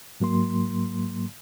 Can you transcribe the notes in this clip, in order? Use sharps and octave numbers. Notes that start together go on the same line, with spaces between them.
G#2 F#3 A#3 C6